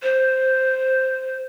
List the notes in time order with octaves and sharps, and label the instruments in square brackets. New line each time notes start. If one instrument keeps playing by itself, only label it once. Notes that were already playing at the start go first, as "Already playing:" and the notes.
[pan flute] C5